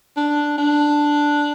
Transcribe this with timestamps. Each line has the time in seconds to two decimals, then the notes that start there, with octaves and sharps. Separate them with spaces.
0.17 D4
0.58 D4